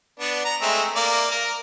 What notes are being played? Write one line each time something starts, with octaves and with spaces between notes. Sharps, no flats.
B3 D4
A#5
G#3 A3 C4
A#3 D5
A#4